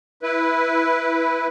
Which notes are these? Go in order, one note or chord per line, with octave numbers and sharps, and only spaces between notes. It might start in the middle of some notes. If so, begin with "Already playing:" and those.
E4 B4